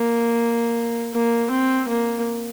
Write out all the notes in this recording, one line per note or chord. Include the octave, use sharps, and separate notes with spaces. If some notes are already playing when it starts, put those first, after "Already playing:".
Already playing: A#3
A#3
C4
A#3